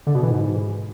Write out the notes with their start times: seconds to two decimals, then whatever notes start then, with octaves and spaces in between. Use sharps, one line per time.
0.07 D3
0.15 B2
0.23 E3
0.31 G#2